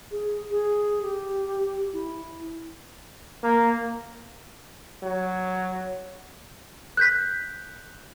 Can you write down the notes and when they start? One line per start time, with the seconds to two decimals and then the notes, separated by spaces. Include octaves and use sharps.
0.11 G#4
0.50 G#4
1.02 G4
1.93 E4
3.44 A#3
5.03 F#3
6.97 F#6 G6 B6